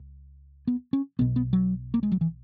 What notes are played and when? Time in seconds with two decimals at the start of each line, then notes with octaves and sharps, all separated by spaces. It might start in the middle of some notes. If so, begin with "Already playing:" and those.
Already playing: C#2
0.67 B3
0.93 C#4
1.19 B1 B2 B3
1.36 B3
1.53 F#3
1.94 A#3
2.03 G#3
2.12 F#3
2.21 E3